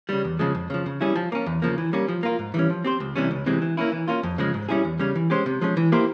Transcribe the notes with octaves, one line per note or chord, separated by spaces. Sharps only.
C#3 G3
E2
C#3 F3 G#3
F2
C#3 F3
C#3
G3 C#4 E4 G#4
F3
A#3 C#4
E2
C#3 F3 A#3
E3
G3 A#3 C#4
F3
A#3 F4 A#4
G#2
E3 G3 C#4
F3
C4 G4 C5
C#2
C3 E3 G3 C#4
C#2
C3 E3 G#3 C4
E3
A#3 C#4 E4
E3
A#3 C#4 F4
F2
C#3 F3 G#3
G#2
G3 C#4 E4 G#4
E2
C#3 G3 C#4
E3
G#3 C#4 G4 C5
C3
F3 G#3 C#4
E3
A#3 E4 G4 C5